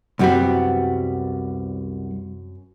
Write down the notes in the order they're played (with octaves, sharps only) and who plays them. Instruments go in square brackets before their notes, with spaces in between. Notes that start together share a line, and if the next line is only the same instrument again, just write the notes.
[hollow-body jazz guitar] C2 G3 B3 [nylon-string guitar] F#2 C4 F#4